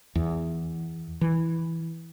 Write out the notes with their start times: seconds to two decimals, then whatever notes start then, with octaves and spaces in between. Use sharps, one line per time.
0.15 E2
1.21 E3